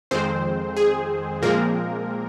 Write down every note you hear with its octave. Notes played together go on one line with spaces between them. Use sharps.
F2 D#3 G#3 C4 C5
G#4
A#2 F3 G#3 A#3 C4 A#4